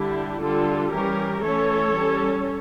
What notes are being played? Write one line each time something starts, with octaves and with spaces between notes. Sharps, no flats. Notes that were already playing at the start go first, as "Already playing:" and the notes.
Already playing: D3 G3 D4 E4 G4
D3 G3 D4 F4 A4
E3 G3 C#4 G4 A#4
E3 A3 C#4 A4 C#5
G3 C#4